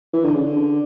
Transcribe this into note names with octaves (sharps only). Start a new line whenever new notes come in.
E3
D3
C#3
D3